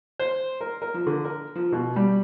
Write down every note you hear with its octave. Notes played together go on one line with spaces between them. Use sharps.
C5
A#4
A#4
F3
D3
A#4
F3
B2
G3